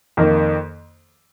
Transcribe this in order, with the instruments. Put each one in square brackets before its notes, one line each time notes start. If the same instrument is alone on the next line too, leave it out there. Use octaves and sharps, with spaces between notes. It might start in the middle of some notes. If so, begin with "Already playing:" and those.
[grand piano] F2 D#3 A#3